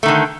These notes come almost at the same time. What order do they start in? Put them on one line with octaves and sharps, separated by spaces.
A3 D#3 D3